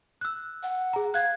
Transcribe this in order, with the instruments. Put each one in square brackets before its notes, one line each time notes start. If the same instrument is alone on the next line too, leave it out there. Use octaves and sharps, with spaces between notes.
[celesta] E6 F#6
[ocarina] F#5
[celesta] G#4 A#5
[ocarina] F5 [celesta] F#6 G#6